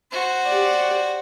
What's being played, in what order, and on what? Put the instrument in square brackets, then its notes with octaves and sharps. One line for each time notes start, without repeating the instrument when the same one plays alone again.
[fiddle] F#4 C5
[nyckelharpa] G4 D5